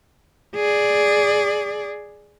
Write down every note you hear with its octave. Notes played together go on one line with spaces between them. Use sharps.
G#4 D5